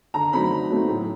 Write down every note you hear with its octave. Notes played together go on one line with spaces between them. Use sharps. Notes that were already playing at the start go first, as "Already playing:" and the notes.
D3 A#5
F#3 A3 C4 D#4 B5
D3
F#3 A3 C4 D#4
A2